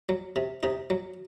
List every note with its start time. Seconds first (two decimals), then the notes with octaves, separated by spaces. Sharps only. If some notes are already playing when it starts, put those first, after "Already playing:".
0.09 F#3
0.36 C3
0.63 C3 D#4
0.90 F#3